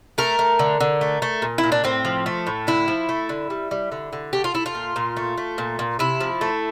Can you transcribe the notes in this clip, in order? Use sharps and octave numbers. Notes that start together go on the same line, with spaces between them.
A3 A#4
A3
D3
D3
A3
A3
A#2
E4
A#2
D4
A2 C4
F3
A3
A2
D3 E4
F3
A3
D3
G3
G3
D3
D3
A3 G4
F4
A3 E4
F4
A#2
A#2
A3
A3
A#2
A#2
C3 E4
F3
A3